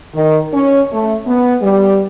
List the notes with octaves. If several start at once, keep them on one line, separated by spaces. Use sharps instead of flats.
D#3
C#4
A3
B3
G3